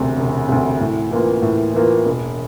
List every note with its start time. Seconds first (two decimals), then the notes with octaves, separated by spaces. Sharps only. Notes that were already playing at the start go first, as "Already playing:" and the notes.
Already playing: E1 D2 C3
0.17 E1
0.49 D2 C3
0.80 A2
1.11 E3 A#3 F4
1.42 A2
1.74 E3 A#3 F4
2.05 E1